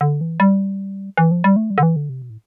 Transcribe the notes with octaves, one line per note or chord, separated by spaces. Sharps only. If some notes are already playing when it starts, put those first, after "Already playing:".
D3
E3
G3
E3
F3
G3
A3
G3
D3
E3
D3
C3
B2
A2